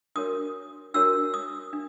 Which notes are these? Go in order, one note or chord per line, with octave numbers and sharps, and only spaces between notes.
D4 F#4 A#4 C#5 D#6
D4 F#4 A#4 C#5 E6
D#6
D4